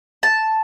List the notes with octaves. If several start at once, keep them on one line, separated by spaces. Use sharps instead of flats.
A5